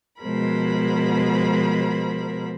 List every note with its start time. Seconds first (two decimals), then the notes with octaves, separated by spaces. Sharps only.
0.22 B2 F3 G#3 A#4 C5 B5